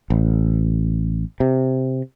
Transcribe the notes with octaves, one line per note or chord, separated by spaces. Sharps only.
A1
C3